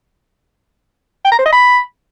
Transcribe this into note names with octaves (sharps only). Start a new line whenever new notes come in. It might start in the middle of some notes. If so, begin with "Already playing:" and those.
G5
A#5
C5
D#5
B5